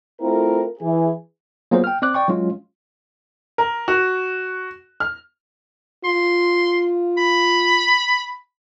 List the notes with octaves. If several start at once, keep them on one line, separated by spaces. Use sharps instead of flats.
A3 C4 E4 F4 A#4
E3 G#4
F#3 A#3 B3 F4 G#4 C5
G5 F6
C4 D5 D6 F#6
D5 G5 C#6
F#3 G#3 C#4 F4
A#4
F#4
F6
F4 C6
B5